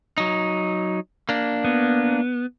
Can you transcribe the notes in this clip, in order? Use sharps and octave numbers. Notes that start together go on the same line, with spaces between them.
F#3 D#4
A#3 D4
B3